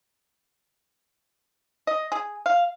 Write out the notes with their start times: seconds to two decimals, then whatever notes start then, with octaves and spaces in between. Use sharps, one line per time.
1.87 D#5
2.12 G#4
2.46 F5